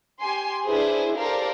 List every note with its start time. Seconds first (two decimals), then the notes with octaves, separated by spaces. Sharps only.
0.21 G4 G#5 C6 C7
0.67 D4 E4 G#4 B4 C5
1.16 G4 A4 A#4 C5 D5 F5